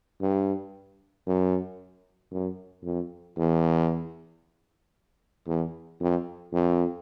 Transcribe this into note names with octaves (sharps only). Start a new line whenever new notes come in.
G2
F#2
F#2
F2
E2
E2
F2
F2